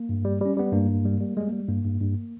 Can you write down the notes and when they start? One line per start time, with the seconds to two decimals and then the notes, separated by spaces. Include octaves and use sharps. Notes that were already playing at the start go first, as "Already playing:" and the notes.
Already playing: A#3
0.09 G2
0.25 G3
0.41 G3 C#4
0.57 G3 B3
0.73 G2 A#3
0.89 G2
1.05 G3
1.20 G3
1.37 G3 G#3
1.47 A#3
1.52 G3
1.58 G#3
1.68 G2 A#3
1.85 G2
2.01 G2